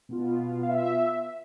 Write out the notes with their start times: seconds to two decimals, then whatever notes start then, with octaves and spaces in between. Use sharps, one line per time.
0.09 B2 B3 F4
0.63 F5
0.69 E5